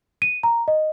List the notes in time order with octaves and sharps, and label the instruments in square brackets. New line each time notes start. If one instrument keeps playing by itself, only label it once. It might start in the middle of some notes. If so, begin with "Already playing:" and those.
[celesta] D#7
A#5
D#5